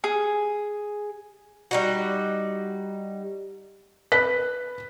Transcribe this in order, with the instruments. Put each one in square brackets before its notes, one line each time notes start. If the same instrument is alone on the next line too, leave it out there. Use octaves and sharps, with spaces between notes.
[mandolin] G#4
[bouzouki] G3 D#4 F#4
[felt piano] B4 B6